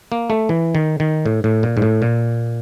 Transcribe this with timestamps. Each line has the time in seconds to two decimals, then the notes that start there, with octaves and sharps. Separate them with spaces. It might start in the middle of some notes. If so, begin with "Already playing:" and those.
0.12 A#3
0.30 A3
0.49 E3
0.75 D#3
1.00 D#3
1.26 A2
1.44 A2
1.63 A#2
1.77 G#2
1.82 A2
2.02 A#2